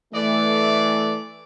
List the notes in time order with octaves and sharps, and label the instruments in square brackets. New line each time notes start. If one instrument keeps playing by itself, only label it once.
[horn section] E3 D5 [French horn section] A3